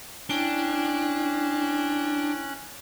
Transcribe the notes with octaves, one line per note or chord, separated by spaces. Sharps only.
C#4 D4 E4 G5 F#6